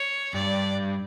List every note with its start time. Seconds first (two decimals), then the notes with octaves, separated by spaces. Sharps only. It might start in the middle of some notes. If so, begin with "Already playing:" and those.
Already playing: C#5
0.34 G2 D5